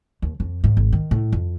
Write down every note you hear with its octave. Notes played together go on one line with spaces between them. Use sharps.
D#2
F2
G#2
G#1
D#3
A2
F2